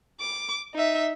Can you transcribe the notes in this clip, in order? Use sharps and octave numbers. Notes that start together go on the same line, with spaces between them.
D6
D#4 E5